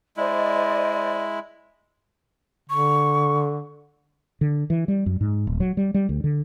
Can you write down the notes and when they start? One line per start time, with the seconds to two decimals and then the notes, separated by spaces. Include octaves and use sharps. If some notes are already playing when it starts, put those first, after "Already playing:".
0.17 G#3 E4 C5 D5 D#5
2.70 D3 C#6
4.41 D3
4.70 E3
4.88 G3
5.06 F#2
5.21 G#2
5.47 D#1
5.60 F#3
5.77 G3
5.94 G3
6.09 D2
6.24 D3